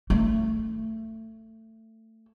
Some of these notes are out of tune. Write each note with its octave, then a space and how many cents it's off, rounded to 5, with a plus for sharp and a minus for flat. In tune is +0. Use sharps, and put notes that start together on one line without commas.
A3 +20